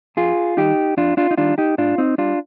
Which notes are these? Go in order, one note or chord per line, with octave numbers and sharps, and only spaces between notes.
F2 F4 G#4
D#3 G3 D#4 G4
F2 D4 F4
D4 F4
D#4
D#3 G3 D4 F4
D#4 G4
G#2 D4 F4
C4 D#4
G3 D4 F4